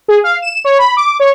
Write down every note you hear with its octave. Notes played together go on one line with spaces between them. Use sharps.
G#4
F5
E7
C#5
B5
D6
C#5